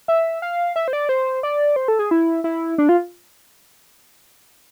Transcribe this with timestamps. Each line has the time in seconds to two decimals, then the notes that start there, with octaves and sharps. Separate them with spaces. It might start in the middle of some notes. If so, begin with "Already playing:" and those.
0.08 E5
0.42 F5
0.76 E5
0.88 C5
0.93 D5
1.09 C5
1.43 D5
1.76 C5
1.88 A4
1.99 G#4
2.11 E4
2.44 E4
2.78 D4
2.89 F4